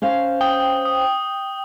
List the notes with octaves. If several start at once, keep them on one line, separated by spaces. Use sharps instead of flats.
C#4 C5 F5
G5 D#6
D#6